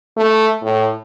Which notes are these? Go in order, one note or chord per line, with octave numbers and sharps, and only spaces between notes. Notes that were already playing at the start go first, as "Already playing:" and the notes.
A3
A2